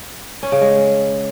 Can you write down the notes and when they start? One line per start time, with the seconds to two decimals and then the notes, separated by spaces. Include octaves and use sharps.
0.43 C#4
0.52 C#3
0.61 G#3